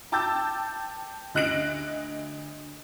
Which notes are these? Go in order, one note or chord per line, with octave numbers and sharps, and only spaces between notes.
G5 A5 D6 E6 G6 A6
D2 D#5 F#6 A#6 D7 F#7